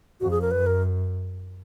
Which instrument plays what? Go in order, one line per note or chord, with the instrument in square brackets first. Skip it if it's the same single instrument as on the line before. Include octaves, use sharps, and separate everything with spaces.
[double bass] F2 [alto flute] F#4
[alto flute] G#4
A#4
[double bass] F#2 [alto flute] B4
[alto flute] A#4